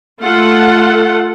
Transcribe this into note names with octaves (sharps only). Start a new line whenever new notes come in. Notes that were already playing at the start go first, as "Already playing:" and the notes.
A3 F4 A4 F#5